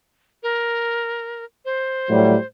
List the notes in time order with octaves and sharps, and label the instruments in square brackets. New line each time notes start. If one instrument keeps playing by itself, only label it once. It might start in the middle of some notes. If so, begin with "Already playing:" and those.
[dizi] A#4
C5
[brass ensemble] A2 F#3 G3